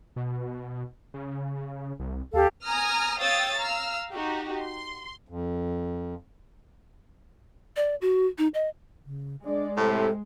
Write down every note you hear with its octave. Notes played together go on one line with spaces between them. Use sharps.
B2
C#3
C2
D#2 G4 A4 F5
G#5 A#5 D#6 F6
C#5 F5 G5 D#6 E6 A6
F5 A#5 E6 F6
D#4 F#4 G4
C6
F2
D5
F#4
D#4
D#5
C#3
G#3 D4 D5
A2 C3 A4